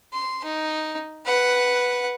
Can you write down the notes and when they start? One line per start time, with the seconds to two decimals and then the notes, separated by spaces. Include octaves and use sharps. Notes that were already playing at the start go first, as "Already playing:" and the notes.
0.13 C6
0.44 D#4
1.26 B4 F#5